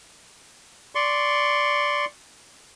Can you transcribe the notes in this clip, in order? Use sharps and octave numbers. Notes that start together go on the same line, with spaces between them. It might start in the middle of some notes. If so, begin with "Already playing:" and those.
D5 C6 C#6